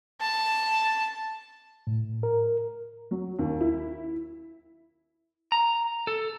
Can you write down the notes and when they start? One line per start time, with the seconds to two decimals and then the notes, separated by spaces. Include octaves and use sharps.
0.21 A5
1.87 A2
2.23 A#4
3.11 F#3
3.39 D#2
3.61 E4
5.52 A#5
6.07 A4